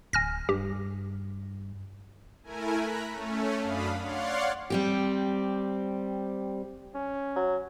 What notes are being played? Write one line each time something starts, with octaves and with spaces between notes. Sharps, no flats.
D1 G#5 F6 A#6
G2 G4
A3 E4 A#4 G#5
A#5 B5 F#6 B6
A3 C#4
F#2 D4 F5 B5 D#6
C#5 D5 F5 F#5 C6
G3 C4 G4
C#4
F#3